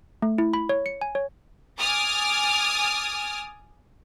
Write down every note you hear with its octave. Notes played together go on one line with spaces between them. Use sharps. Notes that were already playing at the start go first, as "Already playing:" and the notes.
A3
E4
B5
C#5
C#7
G#5
C#5
G#5 D6 D#6 F6 A6